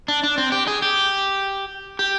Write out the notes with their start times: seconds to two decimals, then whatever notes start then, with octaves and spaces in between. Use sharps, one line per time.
0.08 D4
0.24 D4
0.38 C4
0.52 G4
0.67 G#4
0.82 G4
1.99 G4